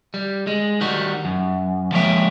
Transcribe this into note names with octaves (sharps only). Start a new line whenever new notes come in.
G3
G#3
D#3 G3 F#4
F#2
F3 G#3 A#3 C#5 E5 G5